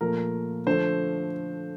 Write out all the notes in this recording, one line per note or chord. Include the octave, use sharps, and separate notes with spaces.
A#2 F3 A3 A#4
D3 F3 A3 C5